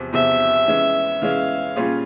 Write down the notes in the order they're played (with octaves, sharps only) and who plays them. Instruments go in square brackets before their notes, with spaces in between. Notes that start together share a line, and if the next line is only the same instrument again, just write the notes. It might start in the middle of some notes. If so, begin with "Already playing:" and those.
Already playing: [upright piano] E2 C3 F3
[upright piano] E2 C3 F3 [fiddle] E5
[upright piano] E3 G#3 C#4
[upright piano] E3 G#3 C#4 [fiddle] F5
[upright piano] A#2 G3 C#4 F4 G#4